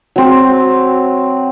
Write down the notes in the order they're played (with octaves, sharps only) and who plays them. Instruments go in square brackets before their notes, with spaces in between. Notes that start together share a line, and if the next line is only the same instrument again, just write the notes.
[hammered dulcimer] F#3 C4